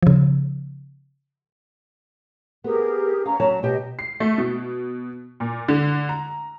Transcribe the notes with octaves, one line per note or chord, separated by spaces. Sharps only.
C#3 F3
B3 G4 G#4 A#4
C#4 F5 A#5
F#3 C#5 A5
B2 G4 D#5
C7
A3
B2
A#2
D3
A#5